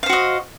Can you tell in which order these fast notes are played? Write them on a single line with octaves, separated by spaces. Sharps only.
F5 C5 F#4 D#5